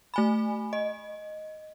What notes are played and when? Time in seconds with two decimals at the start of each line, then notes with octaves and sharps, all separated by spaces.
0.14 A3 G#5 B5
0.73 D#5